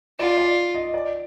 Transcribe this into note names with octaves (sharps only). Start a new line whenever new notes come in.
F4 D5
D5
D#5
D5